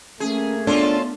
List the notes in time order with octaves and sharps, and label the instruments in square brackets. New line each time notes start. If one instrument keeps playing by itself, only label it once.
[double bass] A3 A#3 [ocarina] C#4 [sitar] G#4
[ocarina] B3 [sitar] C#4 F4 A4 [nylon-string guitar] D4